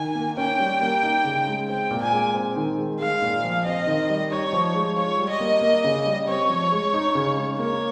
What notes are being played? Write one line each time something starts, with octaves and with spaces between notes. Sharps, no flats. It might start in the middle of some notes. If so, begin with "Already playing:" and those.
Already playing: D#3 G#5
A#3
C#4 G5
G3
A#3
D#4
C#3
G#3
C4 G5
A#2
G#5
G#3
C4
D#3
G#3
G#3 F5
A#2
F3
C4 D#5
D#3
G3
D#4 C#5
F3
G#3
F4 C#5
G3
D#5
A#3
A#3
C#3
G3
C4 C#5
F3
G#3
D#4
C#3
G#3
A#3 C#5